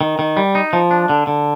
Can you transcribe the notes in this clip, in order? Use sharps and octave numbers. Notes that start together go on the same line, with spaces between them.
D#3
D#3
G3
D#4
F3
D4
D3
D3